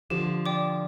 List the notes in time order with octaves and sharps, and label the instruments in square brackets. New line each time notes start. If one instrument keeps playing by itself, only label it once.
[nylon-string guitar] D3 F3 [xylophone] G4
[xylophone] D5 G5 D6